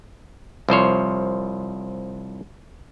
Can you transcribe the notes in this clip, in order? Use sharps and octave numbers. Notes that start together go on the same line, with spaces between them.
C2 F3 C5 C#5